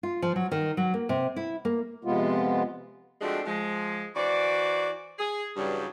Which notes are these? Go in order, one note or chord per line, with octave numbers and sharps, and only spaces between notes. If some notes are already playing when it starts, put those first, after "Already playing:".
F4
F3
F#3
D#3
F#3
A#3
C3
E4
A#3
F2 C3 G#3 B3 F4
F3 G#3 A3 C4 D4 F#4
F3 G#3
E3 F#4 C5 D5
G#4
G2 C#3 E3 F#3 G3